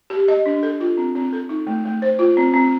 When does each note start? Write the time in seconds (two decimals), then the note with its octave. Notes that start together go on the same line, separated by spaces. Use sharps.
0.10 G4
0.28 D#5
0.46 D4
0.63 A4
0.80 F4
0.97 C4
1.15 C4
1.33 A4
1.49 D#4
1.67 A3
1.85 A3
2.02 C5
2.19 F4
2.37 C4
2.54 C4